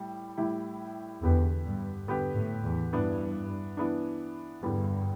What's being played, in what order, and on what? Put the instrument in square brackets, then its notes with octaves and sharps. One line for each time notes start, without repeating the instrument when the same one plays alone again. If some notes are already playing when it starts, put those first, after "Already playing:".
Already playing: [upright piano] A2 G3
A2 G3 E4 G4
[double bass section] E2 [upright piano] D3 B3 G4 B4
[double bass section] G2
[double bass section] G2 [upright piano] D3 B3 G4 B4
[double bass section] A2
E2
[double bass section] G2 [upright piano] E3 B3 D4
[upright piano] E3 B3 D4
[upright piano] E2 D3 G3 B3 [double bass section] G2